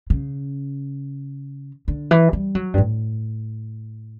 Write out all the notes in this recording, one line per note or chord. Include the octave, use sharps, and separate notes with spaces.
C#3
D3
E3
G3
F#3
G2
A2